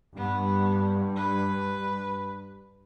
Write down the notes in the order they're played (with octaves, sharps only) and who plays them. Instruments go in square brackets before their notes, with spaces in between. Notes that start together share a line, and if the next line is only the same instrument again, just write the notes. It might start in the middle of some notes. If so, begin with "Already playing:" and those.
[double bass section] G2 [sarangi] B3
[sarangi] B4